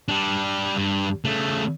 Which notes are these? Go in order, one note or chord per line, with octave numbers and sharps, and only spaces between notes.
G3 D4
G2
C#3 A3